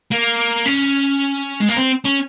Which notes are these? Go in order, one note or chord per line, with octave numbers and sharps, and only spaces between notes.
A#3
C#4
G#3
A#3
C4
C#4